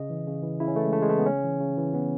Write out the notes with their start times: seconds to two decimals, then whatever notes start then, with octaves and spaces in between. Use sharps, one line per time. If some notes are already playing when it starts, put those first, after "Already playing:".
Already playing: C#3 D#5
0.10 E3
0.27 C#3
0.43 E3
0.60 C#3 E4
0.68 C#4
0.76 E3 A3
0.85 G#3
0.93 C#3 A3
1.02 G#3
1.09 E3 A3
1.19 B3
1.26 C#3 C#4
1.44 E3
1.61 C#3
1.77 E3
1.94 C#3 B3